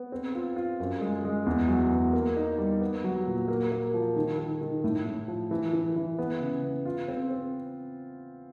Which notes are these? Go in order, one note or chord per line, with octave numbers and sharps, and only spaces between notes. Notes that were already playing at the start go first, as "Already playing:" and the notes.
Already playing: B3
C4
F4
F4
F#2
G#3
G#3
E2
F#3
E2
A#3
D#4
G3
B3
F#3
A#2
A#3
A#3
F3
D#3
D#3
D#3
A2
A2
F3
E3
E3
E3
B3
C#3
B3
F4
C4
C4